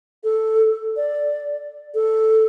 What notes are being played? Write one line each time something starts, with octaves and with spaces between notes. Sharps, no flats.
A4
D5
A4